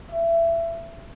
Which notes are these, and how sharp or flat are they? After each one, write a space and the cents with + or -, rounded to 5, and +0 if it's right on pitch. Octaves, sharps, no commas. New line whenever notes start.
E5 +20